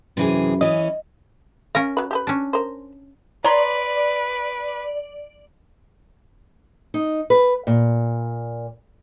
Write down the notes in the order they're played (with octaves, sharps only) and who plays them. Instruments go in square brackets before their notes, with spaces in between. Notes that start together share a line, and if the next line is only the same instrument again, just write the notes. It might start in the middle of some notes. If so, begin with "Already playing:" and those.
[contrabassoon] F#2 [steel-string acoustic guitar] C3 E3 G#4
[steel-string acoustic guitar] E3 C#4 [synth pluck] D#5
[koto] C#4 A#4 A#5 [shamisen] F5
[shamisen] F#3 B4
G4 A4 B4
[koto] C#4 D4
[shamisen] A#4 C5
[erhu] B4 [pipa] C#5 A#5 C6 [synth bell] D5
[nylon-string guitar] D#4
B4
A#2